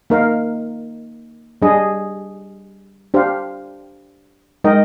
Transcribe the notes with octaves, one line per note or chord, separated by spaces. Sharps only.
A#3 D#4 A#4 F5
G3 D4 G#4 D#5
D4 G4 C5 F5
G#3 D#4 A#4 D#5 G5